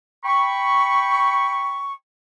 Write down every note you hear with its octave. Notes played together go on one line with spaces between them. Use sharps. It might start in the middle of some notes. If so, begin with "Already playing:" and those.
G5 B5 C#6